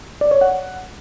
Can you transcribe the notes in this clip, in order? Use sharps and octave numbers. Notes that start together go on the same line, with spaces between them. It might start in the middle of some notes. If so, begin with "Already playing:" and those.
D5
C#5
F#5